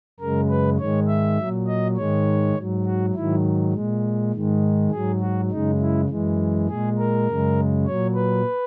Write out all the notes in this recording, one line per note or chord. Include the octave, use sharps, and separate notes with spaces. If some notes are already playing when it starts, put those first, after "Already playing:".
F#2 C#3 G#3 A#4
B4
G#2 D#3 G#3 C#5
E5
A#2 F#3
D#5
G#2 D#3 G#3 C#5
G#2 F#3
F#4
G#2 D#3 F#3 E4
A#2 G#3
G#2 D#3 G#3
G#2 F#3 G#4
F#4
F#2 C#3 G#3 D#4
E4
F#2 E3 G#3
A#2 G#3 G#4
A#4
F#2 C#3 G#3
A#2 F#3 C#5
B4